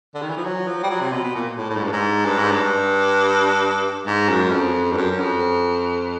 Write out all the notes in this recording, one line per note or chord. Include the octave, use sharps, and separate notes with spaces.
D3
D#3
E3
F3
F#3
F3
G3
F#3
C3
B2
B2
A#2
A2
A2
G#2
G2
G#2
G2
G#2
G2
G#2
F#2
F2
G2
F#2
F#2
F2